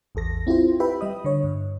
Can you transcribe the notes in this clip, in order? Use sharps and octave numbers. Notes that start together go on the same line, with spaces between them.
A1 E2 A4 A#6
C4 E4 F4 G4 C5
E4 G4 B4 E5 G5 B5
G3 D#5 D#6
D3 C#5
G2